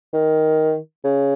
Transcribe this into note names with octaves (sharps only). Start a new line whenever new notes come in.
D#3
C#3